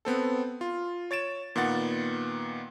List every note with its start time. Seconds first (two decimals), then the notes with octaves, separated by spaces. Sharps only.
0.05 B3 C4 A4
0.61 F4
1.11 C#5 A6 D7 E7
1.56 A#2 D#3 B3 F#5 A6